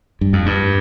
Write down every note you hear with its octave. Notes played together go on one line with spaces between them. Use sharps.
G2
F2
G2